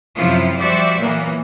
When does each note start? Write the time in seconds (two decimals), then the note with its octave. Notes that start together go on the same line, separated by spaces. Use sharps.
0.16 F#2 C3 F3 F#3 E4 F4
0.59 F3 G3 F#4 C5 D5 E5
1.01 A#2 E3 F#3 A#3 B3